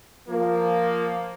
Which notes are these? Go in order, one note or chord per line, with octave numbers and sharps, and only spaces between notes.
F3 A#3